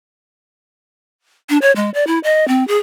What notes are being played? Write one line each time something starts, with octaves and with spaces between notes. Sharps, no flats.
D4
C#5
G#3
D5
E4
D#5
C4
G#4